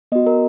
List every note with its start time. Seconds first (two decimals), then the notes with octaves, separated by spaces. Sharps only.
0.12 B3 F#4 D#5
0.27 A#4